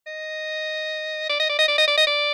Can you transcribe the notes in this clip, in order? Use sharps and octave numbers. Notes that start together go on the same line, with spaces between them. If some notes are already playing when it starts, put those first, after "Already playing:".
D#5
D5
D#5
D5
D#5
D5
D#5
D5
D#5
D5